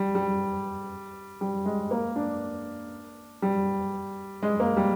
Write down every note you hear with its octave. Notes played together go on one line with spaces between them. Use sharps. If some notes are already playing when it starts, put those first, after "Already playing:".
Already playing: G3
G3
G3
G#3
A#3
D4
G3
G#3
A#3
G3